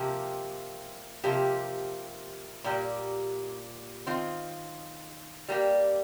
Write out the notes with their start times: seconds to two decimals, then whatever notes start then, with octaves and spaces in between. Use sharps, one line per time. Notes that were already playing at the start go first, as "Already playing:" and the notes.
Already playing: C3 F3 A#3 G4
1.24 C3 F3 A#3 G4
2.64 A#2 G3 A#3 G4
4.07 D#3 C4 F4
5.49 G3 A#3 G4